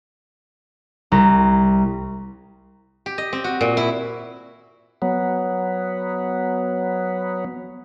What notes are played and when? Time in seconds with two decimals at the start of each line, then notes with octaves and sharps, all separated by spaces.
1.12 C2 A#5
3.06 G4
3.18 D#5
3.33 C4
3.44 F#4
3.61 A#2
3.77 E4
5.02 F#3 B3